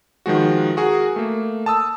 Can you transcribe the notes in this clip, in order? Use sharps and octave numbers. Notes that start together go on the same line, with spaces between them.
D#3 F3 G#3 F#4
F#4 G#4 A#4
A3 A#3
A5 D#6 E6